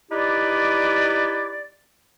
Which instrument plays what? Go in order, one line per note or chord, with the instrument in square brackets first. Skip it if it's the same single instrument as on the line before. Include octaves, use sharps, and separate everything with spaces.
[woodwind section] D#4 E4 G4 B4 D5